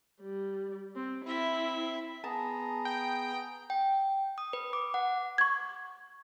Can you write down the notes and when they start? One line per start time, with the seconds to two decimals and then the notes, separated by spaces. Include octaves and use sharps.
0.22 G3
0.95 C4
1.25 C4 E4 E5
2.24 B3 G#4 A5 A#5
2.85 G5
3.70 G5
4.38 D#6
4.53 B4
4.73 D6
4.94 F#5
5.38 C#6 G#6